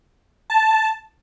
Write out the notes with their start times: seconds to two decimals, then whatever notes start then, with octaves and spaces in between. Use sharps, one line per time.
0.50 A5